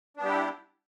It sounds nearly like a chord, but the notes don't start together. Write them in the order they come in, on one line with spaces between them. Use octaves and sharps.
D4 B3 G3 G4 E4